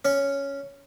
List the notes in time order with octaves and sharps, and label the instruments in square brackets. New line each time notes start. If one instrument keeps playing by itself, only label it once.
[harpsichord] C#4 C#5